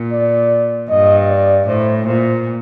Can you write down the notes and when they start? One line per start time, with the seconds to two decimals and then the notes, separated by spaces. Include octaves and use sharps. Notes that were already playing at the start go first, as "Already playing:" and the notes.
Already playing: A#2
0.12 D5
0.90 G2 D#5
1.29 D5
1.67 A2 C5
2.06 A#2 C5